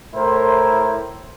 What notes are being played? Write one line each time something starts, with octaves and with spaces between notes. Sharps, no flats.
A2 E4 A#4 C5